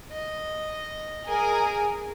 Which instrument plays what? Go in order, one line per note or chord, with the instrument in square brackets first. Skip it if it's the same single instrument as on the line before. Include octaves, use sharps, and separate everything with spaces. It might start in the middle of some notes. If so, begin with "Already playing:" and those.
[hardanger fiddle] D#5
[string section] G#4 A#4 G#5